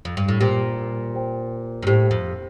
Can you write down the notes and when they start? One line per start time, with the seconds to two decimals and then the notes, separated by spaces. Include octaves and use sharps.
0.05 F2
0.17 G2
0.28 A2
0.40 A#2 G4 C5 G5
1.14 G4 C5 G5
1.83 G2
1.87 A2 G4 C5 G5
2.11 F2